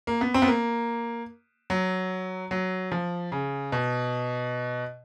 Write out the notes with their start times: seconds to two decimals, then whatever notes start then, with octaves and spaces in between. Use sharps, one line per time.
0.07 A#3
0.21 B3
0.34 C4
0.42 B3
0.48 A#3
1.70 F#3
2.51 F#3
2.92 F3
3.32 C#3
3.72 B2